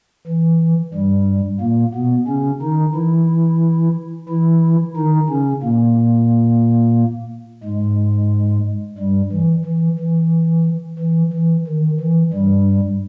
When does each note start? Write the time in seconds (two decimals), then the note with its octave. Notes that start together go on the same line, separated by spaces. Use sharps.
0.27 E3
0.94 G2 G3
1.61 A#2 A#3
1.95 B2 B3
2.28 C#3 C#4
2.62 D#3 D#4
2.95 E3 E4
4.29 E3 E4
4.96 D#3 D#4
5.30 C#3 C#4
5.63 A#2 A#3
7.64 G#2 G#3
8.98 G2 G3
9.32 E3
9.65 E3
9.99 E3
10.99 E3
11.33 E3
11.67 D#3
12.00 E3
12.33 G2 G3